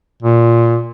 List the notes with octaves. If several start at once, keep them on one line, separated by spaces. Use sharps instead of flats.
A#2